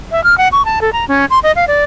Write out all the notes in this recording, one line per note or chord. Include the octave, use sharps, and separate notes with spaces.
E5
F6
F#5
C#6
A5
A4
A#5
C#4
C6
D#5
F5
D5